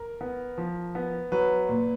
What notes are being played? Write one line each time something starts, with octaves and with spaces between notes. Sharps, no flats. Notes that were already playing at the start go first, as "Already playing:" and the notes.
Already playing: A#4
B3
F3
B3
F#3 B4
A#2